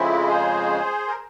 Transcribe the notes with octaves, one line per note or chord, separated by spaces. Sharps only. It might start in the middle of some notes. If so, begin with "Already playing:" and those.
Already playing: F2 C#3 F3 G#3 C4 E4
G#4 C5
A#4